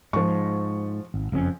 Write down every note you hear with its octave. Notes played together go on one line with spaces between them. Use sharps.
G#2 F3 C#6
G#1
F#1 F2 C#4